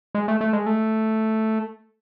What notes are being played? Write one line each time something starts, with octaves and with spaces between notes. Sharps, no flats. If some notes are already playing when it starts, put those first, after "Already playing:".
G#3
A3
A3
G#3
A3